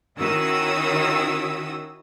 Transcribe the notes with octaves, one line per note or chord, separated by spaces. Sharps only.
D#3 C#4 E4 F#4 D#6 E6